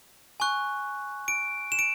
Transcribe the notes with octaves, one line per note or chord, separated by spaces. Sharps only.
G#5 C#6 F#6
D7
E7
D7